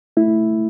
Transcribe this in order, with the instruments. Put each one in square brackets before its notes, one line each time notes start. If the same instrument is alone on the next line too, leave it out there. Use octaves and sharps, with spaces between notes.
[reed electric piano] A3 E4